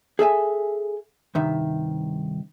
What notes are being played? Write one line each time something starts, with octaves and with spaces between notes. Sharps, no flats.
G#4 A4 E5 G#5
C2 G2 D#3 E5